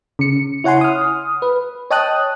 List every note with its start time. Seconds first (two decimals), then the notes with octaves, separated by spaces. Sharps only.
0.19 C#3 C#7
0.64 E4 C#5 F#5 G#5 C6
0.81 D#6 F6
1.42 B4
1.90 C#5 D#5 G5 A5 D#6 F#6